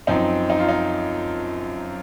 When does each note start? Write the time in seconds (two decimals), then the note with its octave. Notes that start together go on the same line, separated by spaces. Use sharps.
0.07 F#2 F3 C4 D#4
0.50 D#4
0.59 F4
0.69 D#4